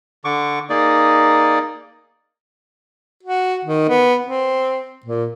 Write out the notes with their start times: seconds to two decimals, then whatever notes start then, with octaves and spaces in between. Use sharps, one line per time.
0.25 D3 C#6 D6
0.70 A#3 D#4 G#4 D5
3.23 F#4
3.65 D#3
3.89 B3
4.26 C4
5.06 A#2